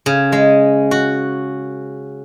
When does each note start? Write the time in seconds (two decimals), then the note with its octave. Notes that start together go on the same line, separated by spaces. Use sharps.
0.06 C#3
0.32 G#3
0.91 F#4